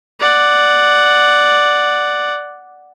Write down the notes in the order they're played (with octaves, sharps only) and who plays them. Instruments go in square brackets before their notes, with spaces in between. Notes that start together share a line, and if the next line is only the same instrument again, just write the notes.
[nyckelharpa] D5 F#5